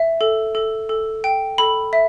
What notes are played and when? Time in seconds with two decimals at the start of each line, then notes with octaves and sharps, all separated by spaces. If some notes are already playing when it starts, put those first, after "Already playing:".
Already playing: E5
0.21 A4
0.55 A4
0.89 A4
1.24 G5
1.58 A4 B5
1.93 E5